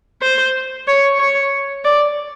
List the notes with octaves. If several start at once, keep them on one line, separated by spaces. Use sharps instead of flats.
C5
C#5
C#5
D5